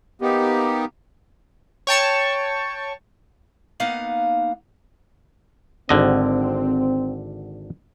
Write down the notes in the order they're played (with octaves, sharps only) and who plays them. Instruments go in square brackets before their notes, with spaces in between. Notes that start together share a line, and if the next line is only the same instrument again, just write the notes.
[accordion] A#3 B3 D#4 G4
[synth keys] C#5 G5 A5 C#6
[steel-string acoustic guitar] A#3 B3 D#4 F5 F#5
[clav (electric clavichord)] G#1 D3 D#5 [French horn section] C4